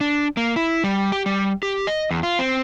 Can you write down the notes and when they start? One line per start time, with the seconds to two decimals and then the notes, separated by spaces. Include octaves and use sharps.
0.01 D4
0.37 A#3
0.56 E4
0.84 G3
1.12 G4
1.26 G3
1.63 G4
1.87 D#5
2.11 E2
2.23 F4
2.39 C4